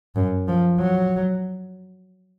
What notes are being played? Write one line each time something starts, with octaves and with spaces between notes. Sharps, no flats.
F#2
F3
F#3